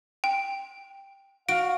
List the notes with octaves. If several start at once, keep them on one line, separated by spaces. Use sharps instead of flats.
G5
F#4 F5 D7